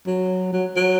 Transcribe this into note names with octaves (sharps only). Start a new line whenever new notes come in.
F#3
F#3
F#3